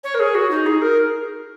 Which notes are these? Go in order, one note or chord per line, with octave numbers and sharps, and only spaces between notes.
C#5
A#4
G#4
F#4
D#4
G#4
A#4